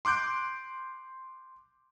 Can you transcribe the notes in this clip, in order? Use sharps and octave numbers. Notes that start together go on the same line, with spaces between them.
C6 D6 F#6 G6 D7